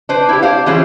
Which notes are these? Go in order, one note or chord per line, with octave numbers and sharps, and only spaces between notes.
D4 B4 C5
E4 G4
G4 C5 D5 F5
E3 G3 C#4 F4 G#4 C5